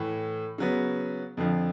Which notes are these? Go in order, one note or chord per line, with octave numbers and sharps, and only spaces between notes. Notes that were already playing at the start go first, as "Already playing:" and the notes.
Already playing: A2 E3 A3
C#3 F#3 B3
F2 D3 F3